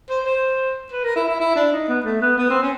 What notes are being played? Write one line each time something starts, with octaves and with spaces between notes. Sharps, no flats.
C5
C5
B4
A#4
E4
E4
E4
D4
D#4
B3
A3
B3
B3
C4
C#4